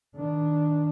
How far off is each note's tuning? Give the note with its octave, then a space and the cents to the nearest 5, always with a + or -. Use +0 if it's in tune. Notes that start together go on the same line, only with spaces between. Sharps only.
D#3 +15 D4 +0